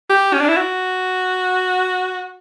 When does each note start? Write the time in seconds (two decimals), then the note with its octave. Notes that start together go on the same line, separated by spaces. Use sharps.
0.10 G4
0.34 C#4
0.41 D4
0.48 E4
0.57 F#4